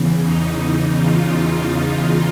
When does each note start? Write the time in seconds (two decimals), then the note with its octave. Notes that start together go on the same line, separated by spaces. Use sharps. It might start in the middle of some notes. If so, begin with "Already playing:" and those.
Already playing: E2 C#3 E3
0.22 D#4
0.60 D#4
0.97 F4
1.35 F4